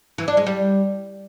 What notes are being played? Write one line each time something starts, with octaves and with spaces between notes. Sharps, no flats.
E3
D4
G#3
G3